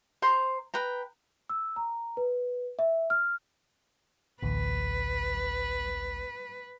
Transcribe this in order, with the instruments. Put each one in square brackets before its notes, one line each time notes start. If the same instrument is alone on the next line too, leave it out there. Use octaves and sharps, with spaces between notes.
[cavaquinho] C5 A#5 C6
B4 G5 A#5
[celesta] E6
A#5
B4
E5
F6
[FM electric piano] A1 D2 [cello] B4